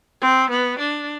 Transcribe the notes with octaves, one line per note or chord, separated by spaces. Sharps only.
C4
B3
D4